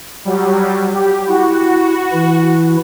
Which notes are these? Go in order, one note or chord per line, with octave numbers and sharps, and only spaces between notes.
F#3 G3
G4
E4 F#4
E3 E4